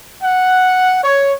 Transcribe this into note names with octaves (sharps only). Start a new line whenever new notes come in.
F#5
C#5